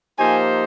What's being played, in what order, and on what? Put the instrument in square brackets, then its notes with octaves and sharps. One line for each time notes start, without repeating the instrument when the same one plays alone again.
[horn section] F3 A#3 D#4 G4 C5 [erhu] G#5